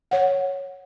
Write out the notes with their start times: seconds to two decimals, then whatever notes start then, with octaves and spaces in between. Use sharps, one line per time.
0.11 C#5 F#5